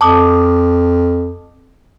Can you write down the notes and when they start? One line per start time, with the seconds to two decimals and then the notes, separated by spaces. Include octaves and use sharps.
0.01 F2 A5 D6 D#6